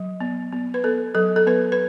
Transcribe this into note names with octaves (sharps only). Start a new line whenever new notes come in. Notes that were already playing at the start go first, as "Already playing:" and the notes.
Already playing: F#3
B3
B3
B4
B3 A4
F#3 A4
A4
B3 B4
B4